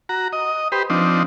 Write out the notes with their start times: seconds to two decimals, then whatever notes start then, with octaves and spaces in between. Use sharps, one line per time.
0.09 F#4 A#5
0.33 D#5
0.72 G4 B4 C5
0.90 F3 C4 D4 D#4